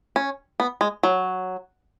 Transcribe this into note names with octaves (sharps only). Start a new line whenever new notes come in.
C#4
B3
G#3
F#3